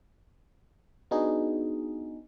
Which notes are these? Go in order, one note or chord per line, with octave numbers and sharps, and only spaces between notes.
B3 D4 D#4 F#4 G#4